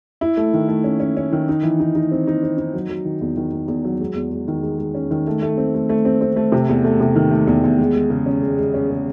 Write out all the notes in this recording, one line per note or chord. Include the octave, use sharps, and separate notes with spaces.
E4
A3
D#3
A3
C#4
C#4
C#4
D#3
D#4
E3
D#4
D#4
C4
D#4
C4
D#4
F#3
F#3
D#3
E2
D#3
E2
E2
F#3
G#3
E2
G#3
D#3
G#3
G#3
C#4
D#3
A3
A3
C4
A3
A3
C4
C4
A3
C3
E2
A3
C3
D#3
A3
E2
E2
G#3
G#3
C#3
C#4
G#3
G#3
C#4
C#3